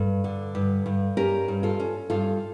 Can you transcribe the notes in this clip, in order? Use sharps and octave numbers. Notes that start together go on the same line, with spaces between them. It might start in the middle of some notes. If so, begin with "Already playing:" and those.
Already playing: G2 A4
D3
G2
G2
C#4 G4 A#4
G2
F4 A4
C#4
G2 F4 A4